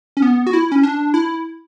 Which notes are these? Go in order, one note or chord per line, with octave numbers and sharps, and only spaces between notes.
C#4
B3
F#4
E4
C#4
D4
E4